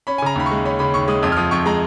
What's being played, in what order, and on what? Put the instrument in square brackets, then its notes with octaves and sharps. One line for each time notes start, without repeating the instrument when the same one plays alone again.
[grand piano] C#4 B5
G#5
C#3 A#5
D#2 B5
C#6
G#3
C#4 B5
C#3 B5
D#2 C#6
G#3 D#6
F2 D#6
F6
F3 D#6
F2 C#6
G#3 A#5